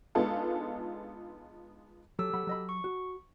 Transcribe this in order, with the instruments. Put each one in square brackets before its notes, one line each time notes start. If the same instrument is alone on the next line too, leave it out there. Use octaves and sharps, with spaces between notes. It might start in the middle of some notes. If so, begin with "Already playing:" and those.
[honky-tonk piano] G#3 B3 D4 D#4 F4 A4
[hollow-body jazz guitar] F#3 [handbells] G4 A4 E6
[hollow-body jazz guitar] F#3 F#5 B5
F#3 D#5 B5
[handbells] C#6
[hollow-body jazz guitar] F#4